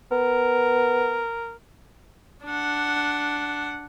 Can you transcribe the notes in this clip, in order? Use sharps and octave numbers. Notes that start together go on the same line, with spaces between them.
B3 A#4
D4 F#5